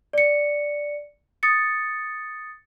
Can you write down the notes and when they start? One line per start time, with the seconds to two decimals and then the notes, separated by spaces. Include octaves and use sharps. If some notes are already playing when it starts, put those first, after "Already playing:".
0.13 D5 C#7
1.43 D#6 A6 C#7